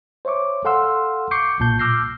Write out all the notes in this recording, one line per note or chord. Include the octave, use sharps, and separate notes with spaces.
C5 C#5 E5 C#6 D6
A4 F5 F#5 C6 E6 F6
C#6 D6 G6 C7 C#7
B1 A#2 A5 G6
D6 E6 F6 G6 A#6 C7